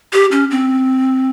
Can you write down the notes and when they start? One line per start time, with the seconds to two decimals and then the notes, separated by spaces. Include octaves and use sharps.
0.13 G4
0.31 C#4
0.51 C4